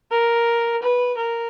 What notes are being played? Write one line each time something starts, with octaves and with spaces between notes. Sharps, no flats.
A#4
B4
A#4